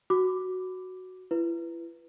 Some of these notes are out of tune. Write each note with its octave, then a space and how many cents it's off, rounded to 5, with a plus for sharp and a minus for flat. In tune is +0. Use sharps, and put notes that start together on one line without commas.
F#4 +0 D6 +0
E4 +35 B4 +0